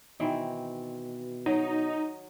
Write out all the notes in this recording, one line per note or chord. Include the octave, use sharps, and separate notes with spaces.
B2 D#3 E3 C4
F#3 D#4